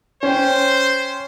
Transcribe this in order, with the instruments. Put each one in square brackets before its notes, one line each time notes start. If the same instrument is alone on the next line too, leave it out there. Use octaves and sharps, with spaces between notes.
[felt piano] C#4 G5 [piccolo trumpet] C5